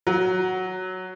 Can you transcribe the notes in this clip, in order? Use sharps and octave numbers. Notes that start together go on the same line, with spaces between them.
F#3